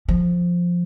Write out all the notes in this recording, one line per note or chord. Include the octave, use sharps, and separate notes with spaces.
F3